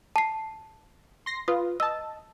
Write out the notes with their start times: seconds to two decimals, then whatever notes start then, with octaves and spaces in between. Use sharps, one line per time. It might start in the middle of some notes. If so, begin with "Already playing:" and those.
0.16 A5 C7
1.26 C6 A#6 C7
1.48 F4 B4 D#6
1.80 D#5 A5 E6